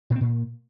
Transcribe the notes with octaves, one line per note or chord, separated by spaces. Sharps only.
A#2
C4
A#2